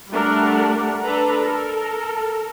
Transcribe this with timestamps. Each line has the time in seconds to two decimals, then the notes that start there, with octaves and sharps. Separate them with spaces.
0.11 G3 A3 D4 A#4 F#5
1.04 D4 A4 B4 A#5
1.43 A4 A#4